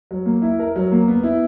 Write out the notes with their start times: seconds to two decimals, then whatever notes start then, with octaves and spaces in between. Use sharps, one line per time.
0.11 F#3
0.26 A#3
0.42 E4
0.59 A#4
0.76 F#3
0.92 A#3
1.08 B3
1.23 E4